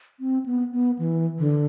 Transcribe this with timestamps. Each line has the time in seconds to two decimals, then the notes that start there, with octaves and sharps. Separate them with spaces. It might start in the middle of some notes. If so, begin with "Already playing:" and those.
0.20 C4
0.46 B3
0.73 B3
0.99 E3
1.39 D3